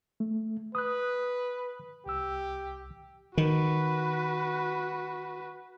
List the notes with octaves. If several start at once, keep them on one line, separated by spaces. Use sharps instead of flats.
A3
B4 D#6 F#6
C2 G4 E6
D#3 F#4 B4